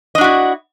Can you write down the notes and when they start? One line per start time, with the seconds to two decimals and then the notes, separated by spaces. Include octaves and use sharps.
0.15 D#5
0.18 D4
0.21 F#4
0.24 E4